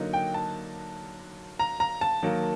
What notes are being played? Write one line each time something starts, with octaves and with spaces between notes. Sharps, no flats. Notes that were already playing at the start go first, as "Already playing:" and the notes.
Already playing: D3 F#3 A#3 D#4
G5
A5
A#5
A#5
A5
D#3 F#3 A#3